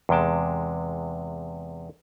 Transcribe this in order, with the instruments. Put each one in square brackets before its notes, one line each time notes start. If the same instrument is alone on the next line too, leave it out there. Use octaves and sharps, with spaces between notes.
[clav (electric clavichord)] E2 C3 G#3 G5 A5